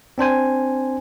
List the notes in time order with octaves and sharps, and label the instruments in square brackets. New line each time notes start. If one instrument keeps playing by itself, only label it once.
[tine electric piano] C4 D4 C5 G#5